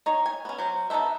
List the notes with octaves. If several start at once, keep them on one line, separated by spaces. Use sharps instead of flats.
D#4 C#5
G#5
B3 C#4
F#3 C5
B3 D#4 A4 C5 E5